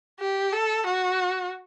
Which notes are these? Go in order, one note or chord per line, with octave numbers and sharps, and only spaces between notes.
G4
A4
F#4